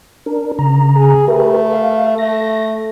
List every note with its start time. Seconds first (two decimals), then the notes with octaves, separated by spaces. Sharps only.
0.26 D4 A#4
0.59 C#3 A#5
0.96 G#4
1.28 A3 G4 A#4 B4
1.73 F5
2.18 A3 A#6